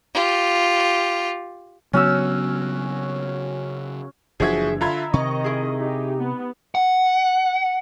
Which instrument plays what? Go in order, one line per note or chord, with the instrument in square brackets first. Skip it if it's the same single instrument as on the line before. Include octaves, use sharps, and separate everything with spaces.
[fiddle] F4 G4
[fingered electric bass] C#3 F#3 B3 [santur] C#4 F#4 E6
[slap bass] F#1 E3 D4 [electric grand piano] F3 F#4 G#6 [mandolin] G#4 E5
[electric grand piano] D3 F4 G#6 [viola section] E5 [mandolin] A#5 B5
[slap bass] C3 [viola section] D#3 D#5 [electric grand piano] C#6
[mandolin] E4 G#4
[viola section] D#4 G4
B3
[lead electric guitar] F#5